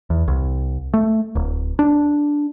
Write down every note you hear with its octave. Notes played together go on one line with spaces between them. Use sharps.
E2
C2
A3
D1
D4